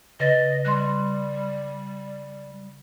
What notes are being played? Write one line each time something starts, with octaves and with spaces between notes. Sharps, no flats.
C#3 B4 D#5 A6
G3 C6 F#6